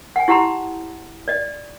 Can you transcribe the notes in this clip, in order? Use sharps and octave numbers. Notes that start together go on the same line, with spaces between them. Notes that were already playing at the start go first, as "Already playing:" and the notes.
F#5 G#5
E4 G4 F#5 A5 A#5 C6
D5 D#5